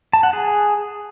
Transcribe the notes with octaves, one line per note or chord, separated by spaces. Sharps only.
A5
F#5
G#4